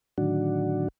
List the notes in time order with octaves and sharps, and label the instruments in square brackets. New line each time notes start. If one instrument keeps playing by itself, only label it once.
[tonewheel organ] A2 D3 D#3 F#3 D4 F#4